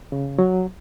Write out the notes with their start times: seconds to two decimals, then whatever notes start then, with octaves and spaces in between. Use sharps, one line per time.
0.12 C#3
0.39 F#3